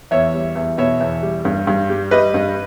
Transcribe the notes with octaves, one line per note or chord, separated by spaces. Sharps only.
E2 C#5 E5
G3
E2
B2 C#5 E5
E2
G3
G2
G2
G3
G3 B4 D#5
G2